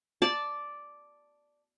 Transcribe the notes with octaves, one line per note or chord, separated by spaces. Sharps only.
D5 A5